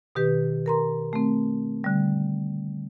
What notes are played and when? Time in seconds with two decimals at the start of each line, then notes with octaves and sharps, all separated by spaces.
0.15 B2 D#3 G4 B4
0.66 A#4 A#5 C6
1.13 A3 C4
1.84 D3 G3